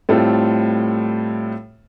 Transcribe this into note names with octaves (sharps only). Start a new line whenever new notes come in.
A2 G3 A3 C4 F4 A4